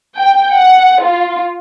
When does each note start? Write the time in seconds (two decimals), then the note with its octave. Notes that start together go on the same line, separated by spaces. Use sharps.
0.17 G5
0.56 F#5
1.04 F4